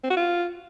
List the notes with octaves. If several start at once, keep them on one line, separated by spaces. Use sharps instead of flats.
C4
F#4
F4